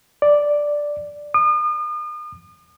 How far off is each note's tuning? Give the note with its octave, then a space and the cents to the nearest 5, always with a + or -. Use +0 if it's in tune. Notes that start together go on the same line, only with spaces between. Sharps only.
D5 +0
D#6 -40